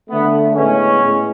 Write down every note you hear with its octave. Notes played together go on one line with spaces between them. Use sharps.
D3 A3 B3
A2 G#3 B3 C#4
A2 G#3